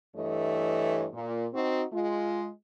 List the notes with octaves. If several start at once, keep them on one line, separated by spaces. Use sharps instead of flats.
G2 E3 A3 C#5 D#5
A#2
C4 D#4 F#4
G#3 F4